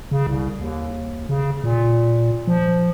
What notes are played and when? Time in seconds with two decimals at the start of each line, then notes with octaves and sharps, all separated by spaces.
0.11 C#3
0.27 C2
0.59 D#2
1.29 C#3
1.64 A#2
2.47 F3